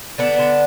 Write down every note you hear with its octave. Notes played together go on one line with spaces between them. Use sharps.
D3 B3 D4
D3